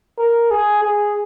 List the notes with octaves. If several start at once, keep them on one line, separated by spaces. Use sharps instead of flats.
A#4
G#4
G#4